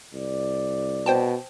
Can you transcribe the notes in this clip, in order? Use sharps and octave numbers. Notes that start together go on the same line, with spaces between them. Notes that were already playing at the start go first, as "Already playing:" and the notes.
C2 D5
B2 C5 G5 A5